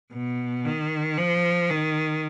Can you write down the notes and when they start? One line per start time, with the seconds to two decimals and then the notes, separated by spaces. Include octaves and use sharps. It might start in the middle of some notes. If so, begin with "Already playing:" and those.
0.13 B2
0.64 D#3
1.17 F3
1.69 D#3